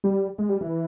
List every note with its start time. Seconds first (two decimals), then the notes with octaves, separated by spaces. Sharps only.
0.04 G3
0.38 G#3
0.49 G3
0.61 E3